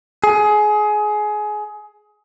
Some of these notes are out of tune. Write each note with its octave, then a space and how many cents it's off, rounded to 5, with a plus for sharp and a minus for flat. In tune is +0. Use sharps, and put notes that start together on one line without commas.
G#4 +20